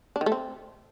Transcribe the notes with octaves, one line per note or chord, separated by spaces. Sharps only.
D4
D#3
A3
C4